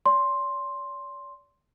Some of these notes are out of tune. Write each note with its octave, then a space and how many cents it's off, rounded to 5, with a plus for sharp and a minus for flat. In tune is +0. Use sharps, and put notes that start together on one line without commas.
D5 -40 C6 +10